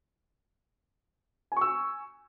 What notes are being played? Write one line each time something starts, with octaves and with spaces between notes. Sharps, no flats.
G#5 C#6 E6